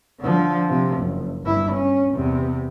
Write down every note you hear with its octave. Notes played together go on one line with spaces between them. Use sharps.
D3 F3
C3 F3
F#1
G1 E4
C#4
E2 C3